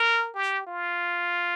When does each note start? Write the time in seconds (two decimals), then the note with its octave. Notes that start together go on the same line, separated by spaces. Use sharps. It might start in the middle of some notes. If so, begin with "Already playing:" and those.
Already playing: A#4
0.35 G4
0.67 F4